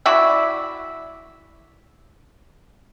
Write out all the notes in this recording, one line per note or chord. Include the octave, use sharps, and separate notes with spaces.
E4 F#4 D5 E5